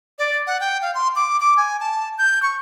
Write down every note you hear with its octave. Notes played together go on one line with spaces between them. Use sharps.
D5
F#5
G5
F5
C6
D6
D6
G#5
A5
G6
C#6